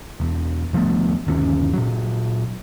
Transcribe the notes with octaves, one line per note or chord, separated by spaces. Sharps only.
E1 E2
D#1 F3 A3 B3
G1 D#2 C#4
A#2 F#3